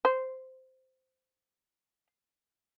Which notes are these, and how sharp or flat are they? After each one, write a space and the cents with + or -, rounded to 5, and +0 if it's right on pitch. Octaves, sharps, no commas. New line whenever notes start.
C5 -10